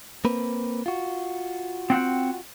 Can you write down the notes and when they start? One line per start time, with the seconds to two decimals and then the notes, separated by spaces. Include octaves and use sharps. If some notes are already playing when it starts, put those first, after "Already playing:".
0.25 A#3 C4 B4
0.86 F4 F#4
1.90 C4 F#5 G5